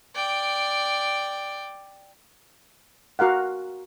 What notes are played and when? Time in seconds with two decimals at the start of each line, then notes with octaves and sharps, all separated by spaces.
0.15 D5 G5
3.19 F#4 A#4 F5 F#5